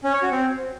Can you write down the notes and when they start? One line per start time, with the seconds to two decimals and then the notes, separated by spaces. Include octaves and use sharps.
0.04 C#4
0.13 C#5
0.22 F#4
0.32 C4